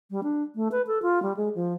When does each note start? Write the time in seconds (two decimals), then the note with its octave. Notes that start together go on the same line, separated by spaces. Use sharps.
0.11 G3
0.23 D4
0.55 A3
0.72 B4
0.87 A4
1.02 F4
1.22 G3
1.37 G#3
1.55 F3